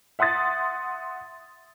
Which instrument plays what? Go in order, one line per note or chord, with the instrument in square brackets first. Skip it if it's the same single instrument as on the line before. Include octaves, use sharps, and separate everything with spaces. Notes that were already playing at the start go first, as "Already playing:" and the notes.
[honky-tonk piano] E5 F#5 C6 D#6 A6